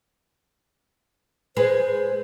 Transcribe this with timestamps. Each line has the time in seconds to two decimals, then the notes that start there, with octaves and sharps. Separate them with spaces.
1.57 G#3 B4 C5